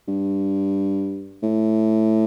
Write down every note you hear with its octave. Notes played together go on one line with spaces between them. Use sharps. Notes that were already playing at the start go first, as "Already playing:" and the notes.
G2
A2